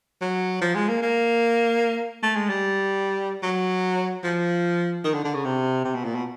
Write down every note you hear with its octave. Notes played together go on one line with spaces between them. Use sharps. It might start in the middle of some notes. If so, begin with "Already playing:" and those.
F#3
F3
G#3
A#3
A#3
A3
G#3
G3
F#3
F3
D#3
D3
D3
C#3
C3
C3
B2
A#2
B2